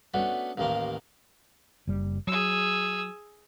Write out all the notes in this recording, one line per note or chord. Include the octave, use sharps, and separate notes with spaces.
A3 B3 C#4 D4 F#4
A1 D#2 A2 A#3 A#4 C6
F#1 G3
F#3 G#4 E6